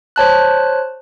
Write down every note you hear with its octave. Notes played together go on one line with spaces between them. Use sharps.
C5 C#5 A5 F#6